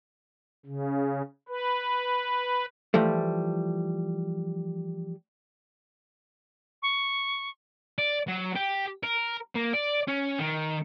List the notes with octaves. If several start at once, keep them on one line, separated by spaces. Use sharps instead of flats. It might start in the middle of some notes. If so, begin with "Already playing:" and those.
C#3
B4
E3 F3 G3 A3
C#6
D5
F#3
G4
A#4
A#3
D5
C#4
D#3